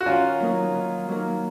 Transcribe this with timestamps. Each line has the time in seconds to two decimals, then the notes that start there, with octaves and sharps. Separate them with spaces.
0.01 F#4
0.06 D#3 C#4 F4
0.40 F#3 A#3 D#4 A#4
0.74 D#3
1.08 F#3 A#3 D#4 A#4